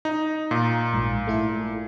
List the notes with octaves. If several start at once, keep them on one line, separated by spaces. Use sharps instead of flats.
D#4
A#2 A#5 D#6 A6
A#1 G#2
A3 E4 A4